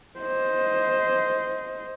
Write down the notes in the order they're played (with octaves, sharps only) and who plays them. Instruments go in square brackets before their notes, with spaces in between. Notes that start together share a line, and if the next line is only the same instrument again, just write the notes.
[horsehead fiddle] C5 D#5